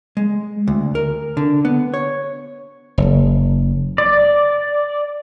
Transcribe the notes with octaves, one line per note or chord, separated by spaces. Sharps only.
G#3
D2
A#4
D3
B3
C#5
F#1
D5